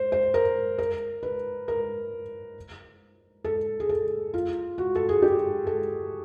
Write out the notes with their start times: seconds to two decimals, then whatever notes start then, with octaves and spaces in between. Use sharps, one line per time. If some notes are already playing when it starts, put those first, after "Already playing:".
Already playing: C5
0.12 C5
0.34 A#4
0.78 A#4
1.23 B4
1.68 A#4
3.44 A4
3.80 G#4
3.89 A4
4.34 F4
4.78 F#4
4.95 A4
5.09 G#4
5.22 G4
5.67 A4